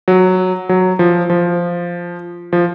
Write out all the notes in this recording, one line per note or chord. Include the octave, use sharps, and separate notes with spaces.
F#3
F#3
F3
F3
F3